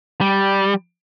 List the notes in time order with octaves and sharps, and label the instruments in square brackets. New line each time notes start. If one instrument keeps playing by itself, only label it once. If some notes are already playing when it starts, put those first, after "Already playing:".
[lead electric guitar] G3